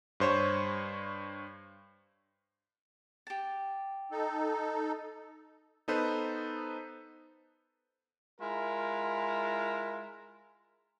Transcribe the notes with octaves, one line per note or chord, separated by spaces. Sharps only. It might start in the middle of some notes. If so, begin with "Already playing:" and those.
G2 C5 C#5
G4 A5
D#4 A4
B3 D#4 A4 B4 C5
G#3 E4 F4 A#4